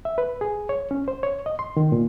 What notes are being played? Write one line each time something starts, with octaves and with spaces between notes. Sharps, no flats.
E5
B4
G#4
C#5
C#4
C5
C#5
D#5
C6
D#3
A#2